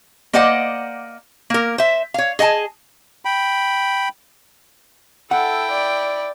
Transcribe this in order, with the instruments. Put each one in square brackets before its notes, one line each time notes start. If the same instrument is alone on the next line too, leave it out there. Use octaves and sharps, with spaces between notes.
[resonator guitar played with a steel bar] A#3 C5 D5 D#5 F#5
A#3 A#4
C5 E5
C#5 F5
G#4 D#5 F#5 G#5 A5
[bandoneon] G5 B5
[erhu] E4 [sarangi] A4 [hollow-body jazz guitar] F#5 [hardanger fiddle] G5
[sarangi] D5